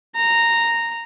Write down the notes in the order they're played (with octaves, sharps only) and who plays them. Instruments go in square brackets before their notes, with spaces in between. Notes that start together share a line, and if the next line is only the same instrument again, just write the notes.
[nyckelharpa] A#5